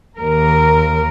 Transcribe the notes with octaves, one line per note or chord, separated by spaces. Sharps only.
D#2 A#4